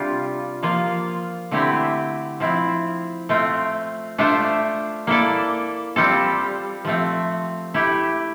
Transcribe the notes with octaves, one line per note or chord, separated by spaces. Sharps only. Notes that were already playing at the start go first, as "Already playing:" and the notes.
Already playing: C3 G3 D4 F4
F3 A#3 F4
D3 A3 C4 E4 G4
F3 C4 E4
A3 C4 F4
A3 D4 F4 C5 E5
A#3 E4 A4 D5
G3 C4 F4 A4
F3 A3 C4
A3 E4 G4